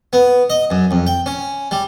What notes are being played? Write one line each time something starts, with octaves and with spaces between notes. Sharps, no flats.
B3
D#5
F#2
F2
G5
C#4
G3